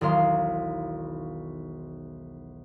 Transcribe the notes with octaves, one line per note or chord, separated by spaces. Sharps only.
E1 B1 D#3 F5 C6